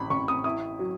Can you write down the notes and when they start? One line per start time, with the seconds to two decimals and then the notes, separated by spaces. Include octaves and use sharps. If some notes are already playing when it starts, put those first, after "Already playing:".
Already playing: A1 B5
0.10 A1 C#6
0.28 D#6
0.44 E4 D#6
0.79 F#3